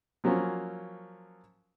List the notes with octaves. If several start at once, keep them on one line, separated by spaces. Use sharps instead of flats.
F3 F#3 A#3 C#4 F4